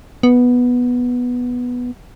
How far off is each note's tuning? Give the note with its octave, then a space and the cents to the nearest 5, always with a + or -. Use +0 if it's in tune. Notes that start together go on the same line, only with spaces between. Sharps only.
B3 -5